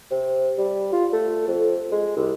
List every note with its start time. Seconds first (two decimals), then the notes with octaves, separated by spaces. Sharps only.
0.11 C3
0.58 G3
0.92 F4
1.13 A3
1.48 F2
1.92 G#3
2.17 C2